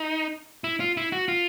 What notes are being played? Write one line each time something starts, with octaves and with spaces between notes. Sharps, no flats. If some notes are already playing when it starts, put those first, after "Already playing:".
Already playing: D#4
E4
F4
E4
F#4
F4